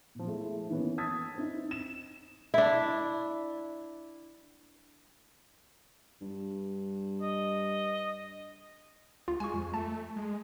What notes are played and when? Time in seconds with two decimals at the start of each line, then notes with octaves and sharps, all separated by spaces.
0.15 A#2 F3
0.27 G#3 A3 E4
0.69 D#3 E3 A#3 B3 C#4
0.98 A5 D#6 E6 G#6 A6 B6
1.36 C4 D#4 E4
1.71 E7
2.54 D4 E4
6.21 G2
7.21 D#5
9.28 D2 F4
9.40 G#3 G#5 C#6
9.54 F2
9.74 A3 A5
10.16 G#3